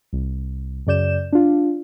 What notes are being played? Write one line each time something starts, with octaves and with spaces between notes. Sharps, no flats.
C2
F#2 C#3 D5 G6 E7
D4 F4